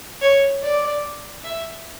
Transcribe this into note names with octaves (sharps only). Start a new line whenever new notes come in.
C#5
D5
E5